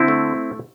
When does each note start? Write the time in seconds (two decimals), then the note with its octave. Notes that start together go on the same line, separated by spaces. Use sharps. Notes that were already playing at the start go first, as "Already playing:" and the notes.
Already playing: D3 C4 E4
0.08 A3